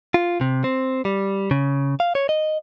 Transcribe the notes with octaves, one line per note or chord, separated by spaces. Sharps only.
F4
C3
C4
G3
C#3
F5
C#5
D#5